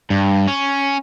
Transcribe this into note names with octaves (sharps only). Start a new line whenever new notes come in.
G2
C#4